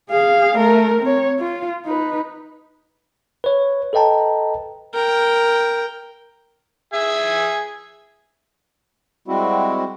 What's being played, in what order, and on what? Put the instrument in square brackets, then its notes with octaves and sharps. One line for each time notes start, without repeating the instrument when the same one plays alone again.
[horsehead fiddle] G#4 F5
A3 A#4
C4 C#5
F4
D#4 B4
[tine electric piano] B4 C#5
A4 B4 D#5 G5 A5 A#5
[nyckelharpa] A#4 G5
[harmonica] G#4 E5 G#5
[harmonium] G3 G#3 C4 E4 F#4